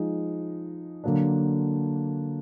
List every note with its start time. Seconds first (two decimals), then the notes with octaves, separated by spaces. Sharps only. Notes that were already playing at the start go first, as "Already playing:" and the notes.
Already playing: F3 G#3 D#4
1.04 D3 F#3 A#3 D4